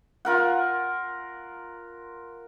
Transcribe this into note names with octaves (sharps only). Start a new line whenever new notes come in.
F4 A#4 F#5